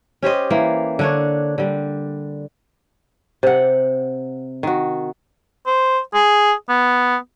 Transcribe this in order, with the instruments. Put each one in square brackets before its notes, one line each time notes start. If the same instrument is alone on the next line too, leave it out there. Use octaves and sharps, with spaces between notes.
[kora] C#4 G4 C5 D#5
E3 A#3
D3 D4 C#5
D3 G3
C3 F#5
D#3 F#4
[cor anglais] C5
G#4
B3